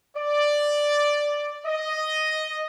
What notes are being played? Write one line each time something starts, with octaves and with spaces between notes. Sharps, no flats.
D5
D#5